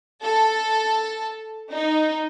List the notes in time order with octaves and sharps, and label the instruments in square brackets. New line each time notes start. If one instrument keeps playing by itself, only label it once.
[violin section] A4
D#4